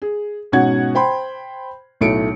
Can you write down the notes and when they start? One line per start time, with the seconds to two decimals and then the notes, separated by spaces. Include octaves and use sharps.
0.02 G#4
0.52 G#2 B2 C#4 F#5 G#6
0.95 C5 G5 B5 C6
2.01 B1 A2 A3 C#7 D7